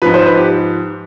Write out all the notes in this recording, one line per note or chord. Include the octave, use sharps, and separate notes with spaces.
G#2 F3 B4
C5
B4
G4